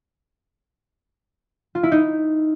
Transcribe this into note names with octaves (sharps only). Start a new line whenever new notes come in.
F4
E4
D#4